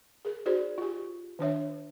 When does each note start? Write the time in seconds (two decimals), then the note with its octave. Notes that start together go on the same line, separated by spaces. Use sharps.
0.25 G#4 A#4
0.46 D#4 F#4 G#4 C5 D5
0.78 F4 G4
1.39 D#3 D4 C#5 E5